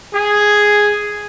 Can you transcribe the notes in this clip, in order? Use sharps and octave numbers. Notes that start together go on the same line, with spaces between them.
G#4